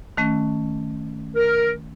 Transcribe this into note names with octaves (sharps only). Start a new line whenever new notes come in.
D#3 A3 C#4
A#4